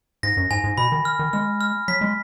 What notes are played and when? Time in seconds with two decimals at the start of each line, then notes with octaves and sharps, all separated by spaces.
0.23 G#2 A#6
0.37 F#2
0.51 G#2 G#5
0.64 G#2
0.78 B2 B5
0.92 D#3
1.05 F6
1.19 D#3
1.33 G#3 F6
1.61 F6
1.88 F#3 B6
2.01 G#3